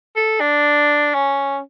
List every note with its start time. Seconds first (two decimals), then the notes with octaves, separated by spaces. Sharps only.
0.16 A4
0.40 D4
1.14 C#4